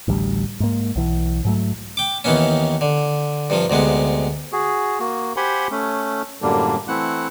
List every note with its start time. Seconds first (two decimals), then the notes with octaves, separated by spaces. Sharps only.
0.08 A1 D2 G3
0.60 G#2 A#3
0.96 B1 E3
1.45 G#2 F#3 A3
1.97 G5 D6
2.24 D#2 D#3 E3 B3 C#4
2.81 D3
3.50 G2 C3 F3
3.70 D2 C3 G#3 B3
4.53 F#4 G#4
5.00 A#3 F#4
5.37 G4 C5 F#5 G#5 B5 C6
5.71 A3 C#4
6.42 F#2 A2 D3 G3 A#3 D4
6.88 E3 A3 C4 E4 F#5 F#6